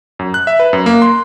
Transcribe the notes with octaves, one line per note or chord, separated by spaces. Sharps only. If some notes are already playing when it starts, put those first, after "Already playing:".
F#2
F#6
E5
B4
F#2
A#3
C6